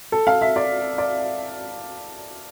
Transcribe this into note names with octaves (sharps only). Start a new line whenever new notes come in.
A4
F5
E5
D5
D5